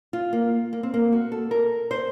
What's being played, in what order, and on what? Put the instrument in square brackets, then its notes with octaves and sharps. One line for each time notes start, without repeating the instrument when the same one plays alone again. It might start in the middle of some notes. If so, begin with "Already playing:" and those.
[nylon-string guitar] F4
A#3
A#3
C4
A#3
F#4
A4
A#4
C5